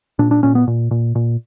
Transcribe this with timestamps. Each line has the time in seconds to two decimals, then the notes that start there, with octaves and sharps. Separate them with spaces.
0.19 A#2 D4
0.31 D4
0.43 A#2 C#4
0.55 B3
0.68 A#2
0.91 A#2
1.15 A#2